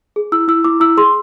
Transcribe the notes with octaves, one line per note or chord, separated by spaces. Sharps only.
G#4
E4 E6
E4 E6
E4 D6
E4 E6
G#4 C6